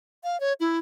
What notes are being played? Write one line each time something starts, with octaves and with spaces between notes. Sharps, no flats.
F5
C#5
E4